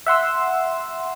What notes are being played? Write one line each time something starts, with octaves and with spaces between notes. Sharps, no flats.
E5 F#5 C6 E6